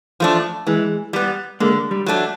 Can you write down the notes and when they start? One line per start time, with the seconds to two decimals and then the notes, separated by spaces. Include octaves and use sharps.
0.20 F3 A3 D4
0.67 E3 G#3
1.13 G3 B3
1.60 D3 G#3 A#3
1.91 G3
2.06 F#3 A3 D4